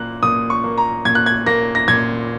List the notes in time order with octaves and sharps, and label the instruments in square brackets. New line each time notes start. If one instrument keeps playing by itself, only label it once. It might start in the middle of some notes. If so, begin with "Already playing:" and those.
Already playing: [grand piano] A#2 A#3 F#6
A#2 D#6
C#6
A#3
A#5
A#2 G#6
F#6
G#6
A#3 A#6
A#6
A#2 G#6